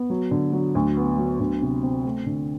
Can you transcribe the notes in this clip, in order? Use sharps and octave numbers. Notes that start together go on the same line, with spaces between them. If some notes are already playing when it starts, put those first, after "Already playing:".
Already playing: B3
F#3
D3
F#3
D2
B3
F#3
D2
C3
C4
A3
D3